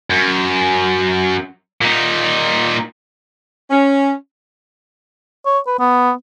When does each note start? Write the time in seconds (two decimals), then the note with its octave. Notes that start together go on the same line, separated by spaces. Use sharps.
0.10 F#2
1.81 A#2 D#4
3.71 C#4
5.46 C#5
5.67 B4
5.79 B3